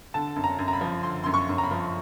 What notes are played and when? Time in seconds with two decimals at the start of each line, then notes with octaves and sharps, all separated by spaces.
0.14 D3 A5
0.36 F#2
0.44 A#5
0.59 F#2
0.68 A#5
0.73 B5
0.81 F3
1.03 D3 C6
1.24 F#2 C6
1.34 C#6
1.49 F#2
1.58 A#5
1.64 B5
1.71 F3